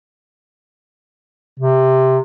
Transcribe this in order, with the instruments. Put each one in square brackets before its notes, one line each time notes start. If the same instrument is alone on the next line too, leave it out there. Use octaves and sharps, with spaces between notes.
[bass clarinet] C3